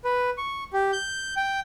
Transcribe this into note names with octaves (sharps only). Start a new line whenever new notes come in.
B4
C#6
G4
G6
G5